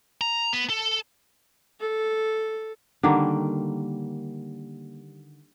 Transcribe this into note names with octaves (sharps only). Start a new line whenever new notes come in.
A#5
B3
A4
A4
D3 D#3 G3 A#3